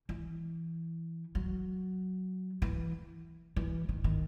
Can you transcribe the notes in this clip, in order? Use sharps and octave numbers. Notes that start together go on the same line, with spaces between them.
E3
F#3
E3
E3
D#3
D#3